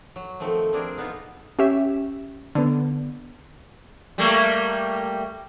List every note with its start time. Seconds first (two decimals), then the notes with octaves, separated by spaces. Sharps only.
0.16 F#3
0.40 D#3 F3 A3 C4
0.73 C4 D4 G#4 A#4
0.97 B2 B3 D#4 F4
1.59 C#4 G4 E5
2.55 D3 B3
4.18 G3 A3 A#3